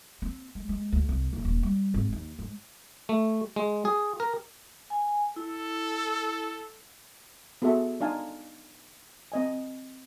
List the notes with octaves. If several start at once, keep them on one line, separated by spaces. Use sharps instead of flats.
C4
G#3
G#3
D2
C2
D#1
D#1
G3
G#1
D#2
G#2
A3
G#3
G#4
A#4
G#5
E4 A4
B3 F#4 G#4 A4 E5
D4 D#4 F5 G#5 A5
C4 D#5 G#5